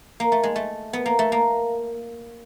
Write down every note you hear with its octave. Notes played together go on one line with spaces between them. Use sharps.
A#3
A3
G#3
A3
B3
A#3
A3
A#3